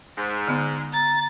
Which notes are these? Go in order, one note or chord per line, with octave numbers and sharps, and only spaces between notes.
G#2
D3 B3
A#5 A6